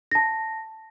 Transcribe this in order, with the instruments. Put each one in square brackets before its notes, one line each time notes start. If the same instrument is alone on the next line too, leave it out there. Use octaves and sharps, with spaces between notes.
[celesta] A5 A#6